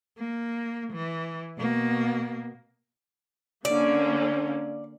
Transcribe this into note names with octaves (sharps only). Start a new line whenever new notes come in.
A#3
E3
B2 A#3
D3 A#3 C#4 D5